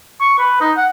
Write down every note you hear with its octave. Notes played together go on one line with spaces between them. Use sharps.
C#6
B4
D#4
F#5